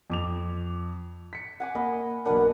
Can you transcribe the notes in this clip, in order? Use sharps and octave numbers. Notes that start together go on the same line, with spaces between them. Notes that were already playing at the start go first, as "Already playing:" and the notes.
F2 D6 F7
B6 C#7
F#5 G#5 D6
A#3 A#4 D#5 B5
B1 A#3 D4 A#4 B4 D#5 F#5